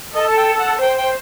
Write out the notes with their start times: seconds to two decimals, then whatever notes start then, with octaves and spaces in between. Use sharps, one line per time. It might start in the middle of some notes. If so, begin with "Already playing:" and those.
0.15 A4 D#5
0.29 A5
0.37 G5
0.59 F#5
0.81 C5 G5
0.98 G5